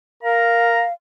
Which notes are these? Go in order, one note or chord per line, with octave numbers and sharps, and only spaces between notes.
A#4 F5 A#5